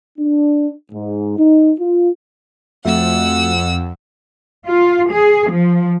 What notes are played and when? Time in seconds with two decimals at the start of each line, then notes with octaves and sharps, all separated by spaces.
0.19 D4
0.92 G#2
1.38 D#4
1.79 F4
2.85 F2 A3 F#4 E5 F#5 E6
4.66 F4
5.11 G#4
5.52 F3